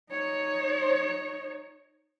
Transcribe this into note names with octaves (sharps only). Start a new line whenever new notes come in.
D#4 C#5